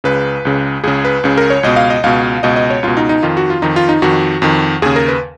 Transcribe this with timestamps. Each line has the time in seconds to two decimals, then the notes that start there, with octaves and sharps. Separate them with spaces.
0.04 C#2 C#3 B4
0.45 C#2 C#3
0.84 C#2 C#3 G#4
1.05 B4
1.24 C#2 C#3
1.38 A#4
1.50 C#5
1.63 C#2 B2 D#5
1.76 F5
1.90 D#5
2.04 C#2 B2 F5
2.43 C#2 B2 D#5
2.56 D#5
2.70 C#5
2.83 C#2 B2 F4
2.97 D#4
3.09 D#4
3.23 F2 D#3 F4
3.37 F#4
3.50 F4
3.62 F2 D#3 D#4
3.76 F4
3.89 D#4
4.02 F2 D#3 F#4
4.42 F2 D#3
4.82 D#2 C#3 G#4
4.96 A#4
5.08 B4